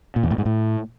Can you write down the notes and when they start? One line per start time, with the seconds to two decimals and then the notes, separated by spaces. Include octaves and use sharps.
0.16 A#2
0.23 E2
0.31 A2
0.38 G#2
0.46 A2